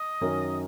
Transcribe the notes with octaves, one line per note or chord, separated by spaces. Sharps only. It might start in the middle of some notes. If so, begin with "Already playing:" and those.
Already playing: D#5
F#2 D#3 F#3 C#4 A#4